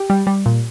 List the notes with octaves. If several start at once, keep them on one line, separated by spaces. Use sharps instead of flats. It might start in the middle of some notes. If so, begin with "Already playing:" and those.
Already playing: G4
G3
G3
A#2